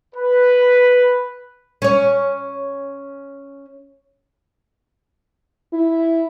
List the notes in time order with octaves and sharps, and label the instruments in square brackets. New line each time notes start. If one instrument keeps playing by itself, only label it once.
[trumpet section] B4
[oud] C#4 C#5
[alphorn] E4